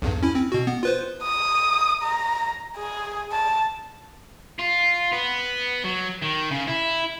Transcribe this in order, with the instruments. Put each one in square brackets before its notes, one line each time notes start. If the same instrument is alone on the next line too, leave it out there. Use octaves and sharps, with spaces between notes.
[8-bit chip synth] B1 E2 G2
C#4 E4
C4
B2 F#4
B3
F4 B4 C5
[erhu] D#6
A#5
G#4
A5
[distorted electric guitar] F4
B3
F#3
D#3
C#3
E4